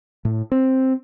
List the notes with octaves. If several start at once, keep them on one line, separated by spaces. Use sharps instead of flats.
A2
C4